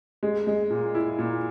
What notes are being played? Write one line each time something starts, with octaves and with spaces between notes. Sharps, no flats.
G#3
G#3
A#2
E4
A#2